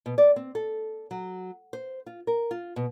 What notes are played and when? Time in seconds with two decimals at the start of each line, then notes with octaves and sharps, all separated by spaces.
0.06 B2
0.18 D5
0.36 C4
0.55 A4
1.11 F#3
1.73 C5
2.06 F4
2.27 A#4
2.51 F4
2.76 B2